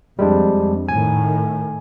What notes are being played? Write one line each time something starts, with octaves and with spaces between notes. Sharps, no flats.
F2 G3 G#3 D4
A2 D#3 G#5